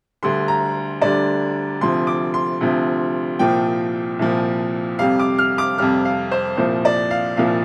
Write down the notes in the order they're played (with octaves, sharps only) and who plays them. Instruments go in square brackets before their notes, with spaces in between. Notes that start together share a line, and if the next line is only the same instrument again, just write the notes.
[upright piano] D2 D3 G3 C6
A#5
D2 D3 G3 D5
D2 C3 F3 C6
D6
C6
D2 C3 F3
C2 A#2 F3 G5
C2 A#2 F3
F2 C3 G3 F5
D6
F6
D6
F2 C3 G3 F6
F5
C5
C2 A#2 F3 C5
D5
F5
C2 A#2 F3 F5